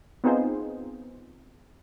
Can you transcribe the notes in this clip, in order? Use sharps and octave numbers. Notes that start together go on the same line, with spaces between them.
B3 C4 D#4 F4 G#4 C5